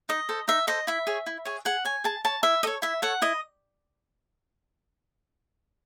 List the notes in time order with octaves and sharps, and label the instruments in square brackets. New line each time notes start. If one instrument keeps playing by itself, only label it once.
[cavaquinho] D#4 D#5
A4 C5
D#4 E5
A4 C5 D#5
E4 E5
G#4 C#5
E4
G#4 C#5
G#4 F#5
C#5 G#5
G#4 A5
C#5 A5
E4 E5
A4 C#5 D#5
E4 E5
A4 C#5 F#5
E4 D#5